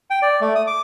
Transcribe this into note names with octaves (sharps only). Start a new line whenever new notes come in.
G5
D5
A3
D#6
D6